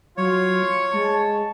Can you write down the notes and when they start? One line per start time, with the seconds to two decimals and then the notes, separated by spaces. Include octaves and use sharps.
0.17 F#3 F4 C#5
0.63 C#7
0.93 G#3 A5